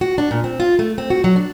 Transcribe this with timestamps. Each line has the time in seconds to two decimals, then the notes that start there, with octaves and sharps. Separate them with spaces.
0.01 F#4
0.18 D4
0.31 A#2
0.44 C4
0.60 F4
0.79 A3
0.98 C4
1.10 F#4
1.24 F#3
1.36 D4